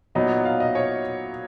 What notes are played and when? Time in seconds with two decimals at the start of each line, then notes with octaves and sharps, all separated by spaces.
0.15 A#2 F#3 B3 D#4 D#5
0.45 F5
0.60 D#5
0.75 C#5